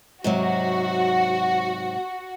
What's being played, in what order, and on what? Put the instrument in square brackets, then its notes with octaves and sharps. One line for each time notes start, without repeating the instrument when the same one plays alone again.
[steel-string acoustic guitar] G#2 C3 F#3 [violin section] F#4